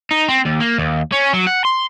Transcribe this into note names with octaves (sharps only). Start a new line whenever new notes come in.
D#4
C4
D#2
A#3
D#2
C#4
F#3
F#5
C6